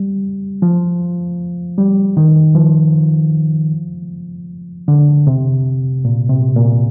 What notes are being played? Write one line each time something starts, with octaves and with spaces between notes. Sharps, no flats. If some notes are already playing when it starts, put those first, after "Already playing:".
Already playing: G3
F3
G3
D#3
F3
D3
C3
A#2
C3
A#2